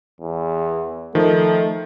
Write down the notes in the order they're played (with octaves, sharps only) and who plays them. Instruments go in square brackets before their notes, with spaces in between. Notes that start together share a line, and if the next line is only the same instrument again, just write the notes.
[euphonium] E2
[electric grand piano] D#3 F3 [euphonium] A3